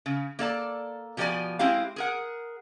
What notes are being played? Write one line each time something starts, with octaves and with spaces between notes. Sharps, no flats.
C#3
A#3 A4 D5 A5
B2 F3 G4 A#4 D5 G#5
G#3 C4 E4 G4 F5
G#4 A#4 F#5